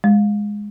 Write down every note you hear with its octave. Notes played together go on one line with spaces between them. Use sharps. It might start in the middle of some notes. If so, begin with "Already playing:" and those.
G#3